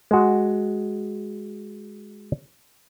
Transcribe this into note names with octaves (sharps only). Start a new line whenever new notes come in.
G#3 F#4